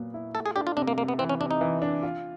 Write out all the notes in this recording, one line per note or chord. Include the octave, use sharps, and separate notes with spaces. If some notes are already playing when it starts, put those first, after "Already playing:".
Already playing: A#2 F#3 B3
E4
A3 A4
G#4
D4 G4
F4
C3 D4
A#3
C3 A#3
B3
E3 C4
C#4
C3 D4
D#4
E3
D4
F4